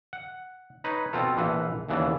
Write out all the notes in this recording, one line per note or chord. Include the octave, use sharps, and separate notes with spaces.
F#5
D#4 B4 C#5
B2 C4 F4 A4
A#1 E3 F3 B4 F5 F#5
D#2 C#3 E3 B3 D4